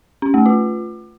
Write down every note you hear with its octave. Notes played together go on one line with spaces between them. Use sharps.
C#4
A3
F4